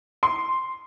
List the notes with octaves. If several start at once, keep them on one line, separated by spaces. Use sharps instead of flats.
C6